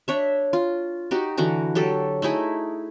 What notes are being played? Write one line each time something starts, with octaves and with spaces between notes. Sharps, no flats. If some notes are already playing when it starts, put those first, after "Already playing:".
D4 C#5 E5
F4
D#4 F#4 G4
D3 E3 F#4 A#5
F#3 G4 A4
A3 D#4 E4 G#4